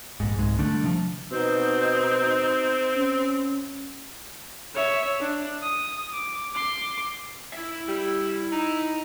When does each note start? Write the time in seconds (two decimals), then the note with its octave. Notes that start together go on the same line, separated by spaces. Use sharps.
0.20 A#1 G#2
0.38 C2 G#2 G#3
0.58 D3 G3 A3 D4
0.84 C3 F3
1.32 B2 C4 D#4 G6
2.95 C#4
4.75 C#5 E5
5.20 D4
5.62 D#6
6.14 D6
6.53 C6 D6
7.53 E4 E5
7.88 G3
8.52 D#4